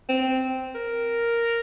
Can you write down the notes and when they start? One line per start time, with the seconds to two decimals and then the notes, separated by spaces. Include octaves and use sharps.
0.09 C4
0.75 A#4